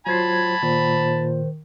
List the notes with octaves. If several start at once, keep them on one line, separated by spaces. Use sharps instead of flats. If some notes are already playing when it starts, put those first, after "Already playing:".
F#3 F4 C5 A5 B5 G#6 C7
A#2 D#3 C5